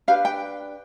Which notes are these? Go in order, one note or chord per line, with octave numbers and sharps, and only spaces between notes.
D4 G4 B4 F5
G5